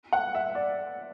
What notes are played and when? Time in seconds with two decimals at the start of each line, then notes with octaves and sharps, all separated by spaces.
0.12 F#5
0.35 E5
0.55 D5